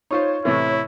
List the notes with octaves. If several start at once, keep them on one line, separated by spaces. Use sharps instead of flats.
D#4 F4 C5 C#5
A2 C3 E3 E4